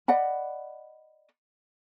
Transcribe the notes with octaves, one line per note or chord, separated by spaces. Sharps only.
D5 D#5 F#5 B5